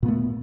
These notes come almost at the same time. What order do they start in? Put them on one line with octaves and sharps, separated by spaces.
A#2 B3 A3